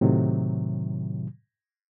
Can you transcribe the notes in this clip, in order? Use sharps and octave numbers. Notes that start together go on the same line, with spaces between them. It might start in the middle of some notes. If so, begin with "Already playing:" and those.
A2 C3 D#3 F#3